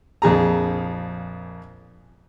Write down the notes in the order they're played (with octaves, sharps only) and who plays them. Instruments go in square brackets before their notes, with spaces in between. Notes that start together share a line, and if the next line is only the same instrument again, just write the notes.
[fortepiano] A#1 F2 G#4 A#5